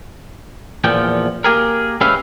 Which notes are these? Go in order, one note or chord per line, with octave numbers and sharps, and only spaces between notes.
E2 A#2 F3 G5
A#3 G4 G#4 A#4
G#3 C#4 G4 B4 E5 F5